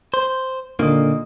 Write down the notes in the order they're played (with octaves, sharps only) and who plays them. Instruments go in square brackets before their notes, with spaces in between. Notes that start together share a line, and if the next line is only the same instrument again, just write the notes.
[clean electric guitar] C5
[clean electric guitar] A#2 D#3 A#3 [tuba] D3 [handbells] F4 D#5 D#6